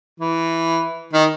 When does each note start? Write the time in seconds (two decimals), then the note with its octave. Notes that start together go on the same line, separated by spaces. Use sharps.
0.20 E3
1.14 D#3